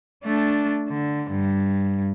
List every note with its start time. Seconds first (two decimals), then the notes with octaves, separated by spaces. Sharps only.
0.25 A3 D4
0.88 D3
1.30 G2